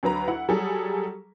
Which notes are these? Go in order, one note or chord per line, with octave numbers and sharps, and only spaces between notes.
D2 F#3 B4 A#5
E4 F#5
F#3 G3 G#4 A4